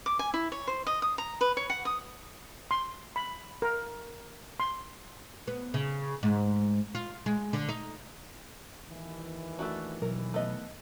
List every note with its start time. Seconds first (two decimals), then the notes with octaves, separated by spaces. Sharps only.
0.06 D6
0.19 G#5
0.34 E4
0.52 C#5
0.67 C5
0.87 D#5
1.02 D#6
1.18 A#5
1.41 B4
1.57 C#5
1.70 F#5
1.85 D#6
2.71 C6
3.16 B5
3.62 A#4
4.60 C6
5.48 B3
5.74 C#3
6.23 G#2
6.95 F4
7.26 G#3
7.53 D3
7.69 D#4
8.88 D#2 D#3 E3
9.59 A3 D4 F#4
10.02 B2 F#3 A#4
10.34 A3 B3 D#5